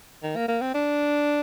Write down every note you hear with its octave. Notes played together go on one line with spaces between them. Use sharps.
D#3
A#3
A#3
C4
D4